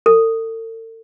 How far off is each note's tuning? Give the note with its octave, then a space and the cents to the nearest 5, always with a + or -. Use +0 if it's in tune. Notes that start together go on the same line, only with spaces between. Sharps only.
A4 +45